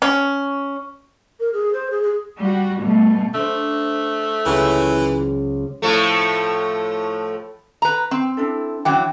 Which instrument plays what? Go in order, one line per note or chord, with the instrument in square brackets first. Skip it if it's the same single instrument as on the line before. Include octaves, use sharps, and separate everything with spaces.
[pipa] C#4
[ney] A#4
G#4
C5
G#4
G#4
[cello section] G3 F#4
B2 G3 A3
[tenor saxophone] A3 [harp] D4 C5
[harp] C#2 F#3 [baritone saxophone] E3
[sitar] A2 F3 A3
[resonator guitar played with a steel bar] B4 A#5
C4
[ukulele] D4 E4 A4
[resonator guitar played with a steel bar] E3 F#3 [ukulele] D4 G5